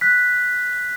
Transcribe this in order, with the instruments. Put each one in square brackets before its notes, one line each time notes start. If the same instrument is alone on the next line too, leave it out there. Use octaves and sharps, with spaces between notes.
[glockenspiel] F#6 B6